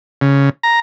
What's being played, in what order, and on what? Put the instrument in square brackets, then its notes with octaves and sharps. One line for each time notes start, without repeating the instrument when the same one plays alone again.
[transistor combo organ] C#3
A#5